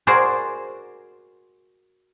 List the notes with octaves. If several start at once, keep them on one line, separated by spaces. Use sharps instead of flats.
F#4 G#4 A#4 C5 D5